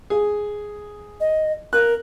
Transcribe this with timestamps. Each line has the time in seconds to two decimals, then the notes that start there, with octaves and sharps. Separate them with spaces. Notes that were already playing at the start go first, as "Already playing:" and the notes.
0.10 G#4
1.20 D#5
1.73 A#4 F#6